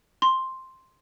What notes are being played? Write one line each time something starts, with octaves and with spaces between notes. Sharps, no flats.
C6